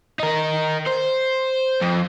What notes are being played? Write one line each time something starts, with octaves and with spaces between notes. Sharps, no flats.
D#4 A#4
C5
F2